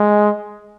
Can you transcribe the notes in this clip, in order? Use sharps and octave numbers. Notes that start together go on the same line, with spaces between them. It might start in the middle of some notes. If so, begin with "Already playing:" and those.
Already playing: G#3